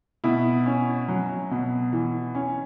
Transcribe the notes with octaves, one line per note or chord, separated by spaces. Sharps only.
B2 E4
C#4
F#3
B2
E3
C#4